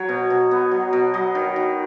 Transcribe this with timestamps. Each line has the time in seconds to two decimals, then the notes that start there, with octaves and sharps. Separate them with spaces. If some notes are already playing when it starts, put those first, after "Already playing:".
Already playing: F#3 C#5
0.09 B2
0.30 B2
0.51 B3
0.71 F#3
0.93 B2
1.14 F#3 D#5
1.35 D#3
1.56 D#3